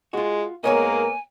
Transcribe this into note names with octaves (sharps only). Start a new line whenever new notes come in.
G#3 F4 F#4
G#2 G#3 A#3 B3 A#4 C#5 D#5 G#5